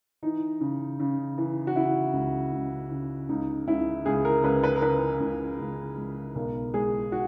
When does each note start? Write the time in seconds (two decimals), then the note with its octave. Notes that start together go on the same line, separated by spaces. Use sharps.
0.23 E3 D#4
0.61 C#3
1.00 C#3
1.38 E3
1.67 F#4
1.76 C#3 E4
2.14 C#2
2.53 C#2
2.91 C#3
3.29 C#2 D#4
3.68 C#2 E4
4.06 C#2 G#4
4.25 A#4
4.44 C#2 B4
4.63 B4
4.76 A#4
4.82 C#3 B4
5.20 C#2
5.59 C#2
5.97 G#3
6.35 B1 A#4
6.74 G#3 G#4
7.12 F#4